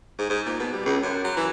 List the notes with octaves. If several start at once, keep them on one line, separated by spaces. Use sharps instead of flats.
G#2
G#2
A#2
B2
G3
C#2
F#2
F#3
E3